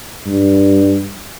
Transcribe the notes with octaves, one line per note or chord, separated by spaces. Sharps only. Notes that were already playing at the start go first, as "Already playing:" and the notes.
G2